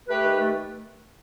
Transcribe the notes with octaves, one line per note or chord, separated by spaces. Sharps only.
A3 G4 B4
D#3
A3